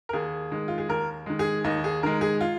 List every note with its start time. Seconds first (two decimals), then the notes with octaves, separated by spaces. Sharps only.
0.09 A#4
0.13 D#2 G#4
0.52 D#3 G#3
0.68 F4
0.78 G#4
0.89 D#2 A#4
1.26 D#3 G#3
1.39 G#4
1.64 D#2 D#4
1.84 G#4
2.03 D#3 G#3 A#4
2.21 G#4
2.41 F4